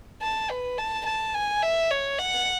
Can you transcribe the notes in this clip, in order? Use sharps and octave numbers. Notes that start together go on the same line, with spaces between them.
A5
B4
A5
A5
G#5
E5
C#5
F#5